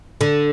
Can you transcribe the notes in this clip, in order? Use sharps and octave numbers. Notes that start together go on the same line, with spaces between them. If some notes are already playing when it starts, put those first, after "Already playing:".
D3